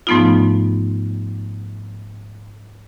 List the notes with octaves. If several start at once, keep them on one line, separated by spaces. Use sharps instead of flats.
G#2 F3 A3 B3 D#4 F4